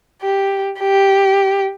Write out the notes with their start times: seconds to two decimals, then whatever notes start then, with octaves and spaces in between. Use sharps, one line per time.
0.22 G4
0.80 G4